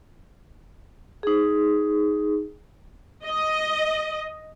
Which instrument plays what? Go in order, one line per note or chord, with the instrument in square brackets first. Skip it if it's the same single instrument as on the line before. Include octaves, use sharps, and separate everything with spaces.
[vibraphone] D#4 G#4
[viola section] D#5